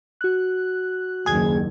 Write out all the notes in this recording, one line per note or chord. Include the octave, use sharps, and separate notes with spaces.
F#4 F#6
F#1 D#2 G#4 G#6